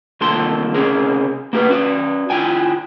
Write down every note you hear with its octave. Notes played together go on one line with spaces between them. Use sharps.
C2 A#2 D#3 A4 C6
C3 C#4 G#4 A#4
A#3 B3 G4 A#4 B4
C#4 F#4 D5
E4 F4 G5 G#5